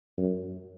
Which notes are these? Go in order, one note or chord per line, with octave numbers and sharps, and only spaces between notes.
F#2